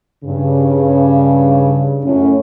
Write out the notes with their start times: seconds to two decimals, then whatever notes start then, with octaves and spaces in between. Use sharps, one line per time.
0.24 G2 C#3
2.04 F#2 A2 C#4